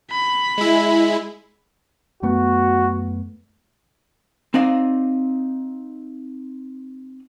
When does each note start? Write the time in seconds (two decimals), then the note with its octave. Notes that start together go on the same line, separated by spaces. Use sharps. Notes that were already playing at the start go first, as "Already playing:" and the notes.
0.11 B5
0.58 G#3 E4
2.23 F#2 A3 B3 F#4
4.54 C4 D#4 D5 D#5 F5